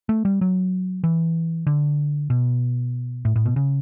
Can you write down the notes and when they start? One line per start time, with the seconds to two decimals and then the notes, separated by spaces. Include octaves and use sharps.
0.09 A3
0.25 G3
0.41 F#3
1.04 E3
1.67 D3
2.30 B2
3.25 A2
3.36 A2
3.46 B2
3.56 C#3